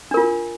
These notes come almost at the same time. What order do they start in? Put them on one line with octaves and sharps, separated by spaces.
D4 A#4 F4